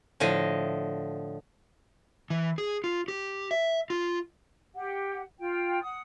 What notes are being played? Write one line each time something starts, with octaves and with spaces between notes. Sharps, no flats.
A2 D3 F3 D#5
E3
G#4
F4
G4
E5
F4
G4 F#5
F4 G5
F#5 D#6